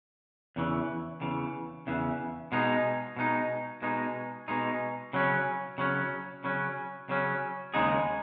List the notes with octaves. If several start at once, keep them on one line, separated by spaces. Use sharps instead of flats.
E2 C#3 E3
E2 C#3 E3
E2 C#3 E3
B2 G#3 D#4
B2 G#3 D#4
B2 G#3 D#4
B2 G#3 D#4
C#3 F#3 C#4
C#3 F#3 C#4
C#3 F#3 C#4
C#3 F#3 C#4
D#2 C#3 G#3 D#4 G#4